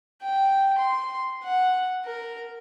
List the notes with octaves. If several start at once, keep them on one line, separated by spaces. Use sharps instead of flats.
G5
C6
F#5
A#4